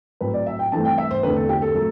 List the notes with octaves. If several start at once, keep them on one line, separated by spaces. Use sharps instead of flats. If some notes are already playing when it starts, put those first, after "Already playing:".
A2 F#3 C4 B4
D5
E5
G5
G2 E3 A3 C4 A5
G5
E5
C5
E2 D3 A3 C4 B4
A4
G4
A4
F#3 A3 A4